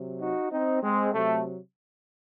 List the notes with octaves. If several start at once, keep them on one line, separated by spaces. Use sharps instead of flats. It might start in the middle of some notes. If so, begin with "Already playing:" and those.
Already playing: C3 F#3
D#4 F#4
C4 D#4
G#3 C4
C3 F#3 A3